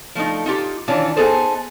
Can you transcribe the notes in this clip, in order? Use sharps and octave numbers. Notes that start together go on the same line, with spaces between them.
F3 A3 C#4 D#4
D#4 F4 G4
D#3 E3 C#4 D4 F4
B3 D#4 G#4 A4 C5